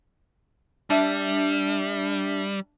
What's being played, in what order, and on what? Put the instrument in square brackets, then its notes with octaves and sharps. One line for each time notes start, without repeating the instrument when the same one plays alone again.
[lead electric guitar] G3 [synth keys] D4 E5